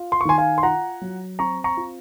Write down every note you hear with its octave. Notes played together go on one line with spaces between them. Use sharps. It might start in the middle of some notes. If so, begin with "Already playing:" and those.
Already playing: F4
C6
C#6
D#3 G#5 C6
F5 G#5
C6
F4 F#5 A#5
F#3
C4 A#5 C#6
A#5 C#6
F4